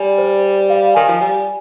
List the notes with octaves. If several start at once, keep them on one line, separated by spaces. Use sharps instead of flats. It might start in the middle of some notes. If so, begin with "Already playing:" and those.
Already playing: G3 D5 G#5
C5
F5
D#3 G#5
F3
G3 G#5